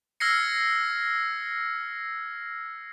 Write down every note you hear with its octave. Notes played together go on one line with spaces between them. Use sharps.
E6 F6 G#6 A#6 C7 C#7